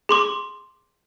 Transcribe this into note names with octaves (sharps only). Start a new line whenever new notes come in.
G#4 C6 D6